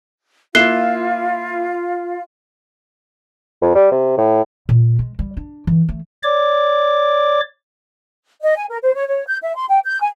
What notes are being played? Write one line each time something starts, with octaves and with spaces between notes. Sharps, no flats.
A#3 E4 F4 F5 F#6 C7 E7 G7
F2
G3
C3
A2
A#2
G#3
G3
D4
E3
A3
C#5 D5 D6
D#5
G#5
A#4
C5
C#5
C#5
G6
E5
C6
G5
G6
G#5